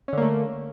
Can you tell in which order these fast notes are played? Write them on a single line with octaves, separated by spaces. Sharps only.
C#4 D3 A#3 A3